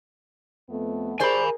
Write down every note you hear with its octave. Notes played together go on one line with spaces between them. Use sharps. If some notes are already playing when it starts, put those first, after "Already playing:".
F2 A3 B3
G4 G#4 A#4 C5 D5 G#5 B5